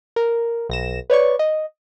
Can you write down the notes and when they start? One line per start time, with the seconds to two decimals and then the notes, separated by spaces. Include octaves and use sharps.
0.16 A#4
0.69 B1 A#6 E7
1.10 B4 C#5 D5 C#6
1.39 D#5